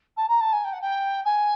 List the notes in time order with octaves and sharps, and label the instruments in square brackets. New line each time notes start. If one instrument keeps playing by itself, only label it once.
[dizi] A5
A#5
A5
G#5
G5
F#5
G5
G#5